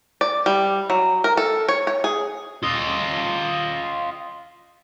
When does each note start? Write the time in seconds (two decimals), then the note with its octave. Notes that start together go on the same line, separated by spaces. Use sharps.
0.21 D5
0.46 G3
0.90 F#3
1.24 A#4
1.37 A4
1.68 C#5
1.87 C#5
2.04 G#4
2.63 F4 D#5